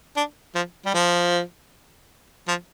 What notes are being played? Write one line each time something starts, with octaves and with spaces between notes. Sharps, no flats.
D4
F3
G3
F3
F3